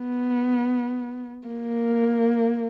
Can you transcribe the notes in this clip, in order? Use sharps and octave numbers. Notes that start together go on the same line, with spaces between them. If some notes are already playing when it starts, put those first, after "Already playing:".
Already playing: B3
A#3